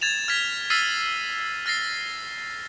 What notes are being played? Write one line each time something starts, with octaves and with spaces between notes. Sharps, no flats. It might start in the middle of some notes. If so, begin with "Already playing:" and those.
G#6 A6 E7 F7
F6 G#6 B6
E6 F6 A6 B6 C7 D#7
F6 A6 A#6 C7